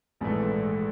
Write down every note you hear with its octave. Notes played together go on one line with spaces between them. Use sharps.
A#1 G#2 E3 A3